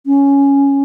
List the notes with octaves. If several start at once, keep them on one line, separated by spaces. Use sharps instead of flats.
C#4